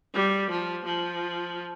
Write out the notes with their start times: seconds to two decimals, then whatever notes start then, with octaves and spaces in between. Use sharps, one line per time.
0.14 G3
0.50 F3
0.85 F3